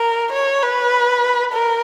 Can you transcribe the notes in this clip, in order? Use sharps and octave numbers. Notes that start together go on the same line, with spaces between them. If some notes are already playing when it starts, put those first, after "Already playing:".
Already playing: A#4
C#5
B4
A#4